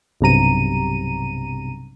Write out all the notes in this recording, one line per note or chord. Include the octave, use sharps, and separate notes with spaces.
B1 G2 C3 A#5 D#7